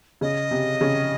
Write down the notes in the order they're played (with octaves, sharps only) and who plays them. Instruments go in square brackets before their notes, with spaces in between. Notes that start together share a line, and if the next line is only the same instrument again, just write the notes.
[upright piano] C#3 [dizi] D#5
[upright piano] C3
C#3